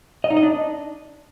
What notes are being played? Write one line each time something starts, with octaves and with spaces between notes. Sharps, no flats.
D#5
D#4
D#5
D4